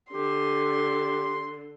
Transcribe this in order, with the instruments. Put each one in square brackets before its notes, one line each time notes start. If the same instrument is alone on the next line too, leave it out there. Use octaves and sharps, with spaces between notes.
[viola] D3 [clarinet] G4 [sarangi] C6